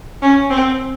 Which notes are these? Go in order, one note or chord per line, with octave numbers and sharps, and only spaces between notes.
C#4
C4